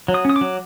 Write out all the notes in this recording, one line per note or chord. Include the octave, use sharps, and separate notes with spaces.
F#3
D#6
C#4 D#6
D6
F#3